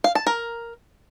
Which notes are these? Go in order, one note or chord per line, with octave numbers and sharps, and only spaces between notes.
F5
A5
A#4